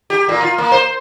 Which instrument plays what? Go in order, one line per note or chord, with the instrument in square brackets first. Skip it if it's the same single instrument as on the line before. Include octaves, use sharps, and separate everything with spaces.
[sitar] G4
A#2
F4
A#3
C5